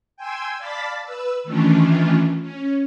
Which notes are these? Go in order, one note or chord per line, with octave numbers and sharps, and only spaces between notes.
G5 G#5 C6 E6 G#6
D5 F5 A5 B5 A6 B6
B4 E6
D#3 E3 A3 C#4 D4 F4
C#4